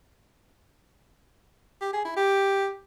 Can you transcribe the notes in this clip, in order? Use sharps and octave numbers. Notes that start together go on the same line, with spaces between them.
G4
G#4
E4
G4